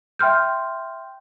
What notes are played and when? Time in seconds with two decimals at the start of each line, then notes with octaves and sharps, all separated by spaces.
0.19 E5 G5 C6 F6 G6